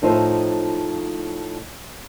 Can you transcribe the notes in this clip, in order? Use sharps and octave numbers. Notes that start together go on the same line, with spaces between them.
A2 F3 D#4 C5 E5